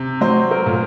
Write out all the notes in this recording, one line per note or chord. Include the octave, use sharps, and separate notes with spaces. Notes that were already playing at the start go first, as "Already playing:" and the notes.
Already playing: C3
F#3 C5
A#4
A#2